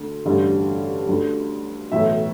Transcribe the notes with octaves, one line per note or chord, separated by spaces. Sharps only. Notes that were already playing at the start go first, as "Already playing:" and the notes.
Already playing: D2 D3
A1 G2 D3
D2 D3
B1 A2 E3 E5